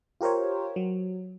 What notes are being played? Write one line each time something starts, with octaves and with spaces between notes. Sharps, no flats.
F4 G4 A#4 C5 C#5
F#3